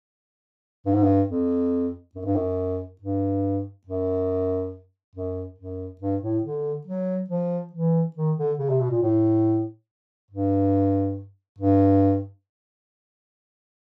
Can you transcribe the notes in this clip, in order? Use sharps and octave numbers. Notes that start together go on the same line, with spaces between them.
G2
G#2
G2
F2
F#2
G2
F#2
G2
F#2
F#2
F#2
G2
A2
D3
F#3
F3
E3
D#3
D3
C#3
C3
B2
A#2
A2
G2
G2